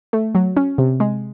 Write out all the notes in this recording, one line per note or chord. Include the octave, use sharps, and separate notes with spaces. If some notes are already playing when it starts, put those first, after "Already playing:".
A3
F#3
C#4
C3
G#3